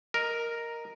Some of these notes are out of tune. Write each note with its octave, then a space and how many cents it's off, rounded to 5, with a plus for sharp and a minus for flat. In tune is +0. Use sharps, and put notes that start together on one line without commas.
A#4 +0 D#5 +0